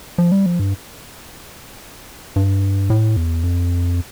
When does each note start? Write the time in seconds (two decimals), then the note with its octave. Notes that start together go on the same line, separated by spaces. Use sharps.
0.18 F3
0.32 G3
0.46 F3
0.59 G2
2.36 G2
2.90 A2
3.17 E2
3.44 F2